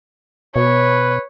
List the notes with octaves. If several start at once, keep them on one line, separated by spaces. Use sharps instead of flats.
B2 B4 C#5